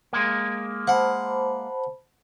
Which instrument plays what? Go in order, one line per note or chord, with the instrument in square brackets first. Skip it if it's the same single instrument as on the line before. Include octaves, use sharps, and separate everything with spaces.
[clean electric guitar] G#3 A#3
[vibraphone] C5 A5 B5 [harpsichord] F#5